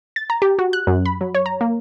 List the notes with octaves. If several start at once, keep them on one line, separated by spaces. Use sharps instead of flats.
A6
A#5
G4
F#4
F#6
F#2
B5
F#3
C#5
A#5
A#3